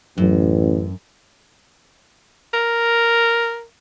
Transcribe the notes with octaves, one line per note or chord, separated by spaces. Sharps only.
A1 F#2
A#4